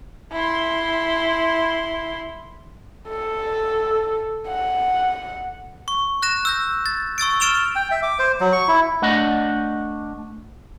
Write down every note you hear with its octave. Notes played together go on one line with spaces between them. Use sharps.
E4 C6
A4
F#5
C#6
F#6 A#6 E7
E6 G6 A#6
A6
C#6 E6 A6 D7
F6 A6 D7 E7 F7 G7
G5
E5
D6
C5
F#3
C#6
E4
A3 D4 D#5 F#5